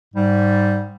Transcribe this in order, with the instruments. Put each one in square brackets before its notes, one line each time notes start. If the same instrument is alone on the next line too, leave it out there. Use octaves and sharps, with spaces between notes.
[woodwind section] G#2 G3